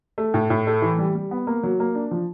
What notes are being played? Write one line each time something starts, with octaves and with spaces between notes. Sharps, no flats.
A3
A2
A2
A3
E3
G3
G3
B3
A#3
F#3
A#3
D4
F3